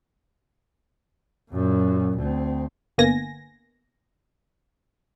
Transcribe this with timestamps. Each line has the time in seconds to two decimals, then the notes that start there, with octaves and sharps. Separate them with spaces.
1.51 F#2 A#2
2.18 D2 C4
2.98 G1 D3 A#3 B3 G#5 A#6